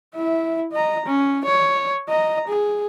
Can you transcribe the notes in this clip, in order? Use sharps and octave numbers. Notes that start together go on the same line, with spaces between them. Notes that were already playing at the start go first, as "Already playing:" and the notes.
E4 E5
D#5 A#5
C#4
C#5
D#5 A#5
G#4